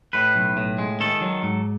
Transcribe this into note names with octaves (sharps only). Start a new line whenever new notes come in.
A2 B4
B1
A2
G#3
D#3 A4
F#3
G#2